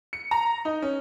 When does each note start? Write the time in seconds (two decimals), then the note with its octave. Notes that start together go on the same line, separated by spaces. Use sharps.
0.13 C#7
0.31 A#5
0.65 D#4
0.82 C#4